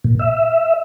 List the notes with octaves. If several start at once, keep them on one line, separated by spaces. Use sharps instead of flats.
A#2
E5